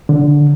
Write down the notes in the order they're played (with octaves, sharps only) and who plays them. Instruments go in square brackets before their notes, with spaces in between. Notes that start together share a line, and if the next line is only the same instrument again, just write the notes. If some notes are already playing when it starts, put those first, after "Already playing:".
[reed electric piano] D3